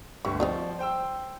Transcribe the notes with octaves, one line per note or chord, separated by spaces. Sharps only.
G1 D2 G3 C#6
F3 G3 C4 D#4
C5 G5 E6